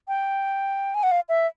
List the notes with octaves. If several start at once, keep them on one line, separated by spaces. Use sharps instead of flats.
G5
G#5
F#5
F5
E5